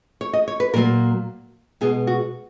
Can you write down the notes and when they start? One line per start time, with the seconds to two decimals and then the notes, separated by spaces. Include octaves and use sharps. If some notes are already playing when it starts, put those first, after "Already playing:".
0.21 C#5
0.33 D#5
0.48 C#5
0.60 B4
0.74 A#2 F#3 A#3 A#4
1.81 B2 G#3 B3 G#4
2.07 F#4